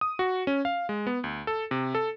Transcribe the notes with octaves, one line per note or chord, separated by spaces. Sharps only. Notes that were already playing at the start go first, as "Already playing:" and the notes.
D#6
F#4
C#4
F5
G#3
B3
D2
A4
C3
A4